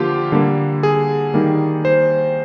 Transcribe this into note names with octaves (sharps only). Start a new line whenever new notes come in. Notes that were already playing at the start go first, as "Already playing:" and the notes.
Already playing: D3 F3 A#3 F4 G4
D3 G3 A#3
G#4
D#3 G3 A#3
C5